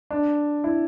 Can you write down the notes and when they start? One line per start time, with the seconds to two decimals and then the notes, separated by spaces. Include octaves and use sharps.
0.11 D4
0.64 E4